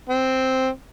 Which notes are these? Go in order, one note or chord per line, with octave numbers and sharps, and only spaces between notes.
C4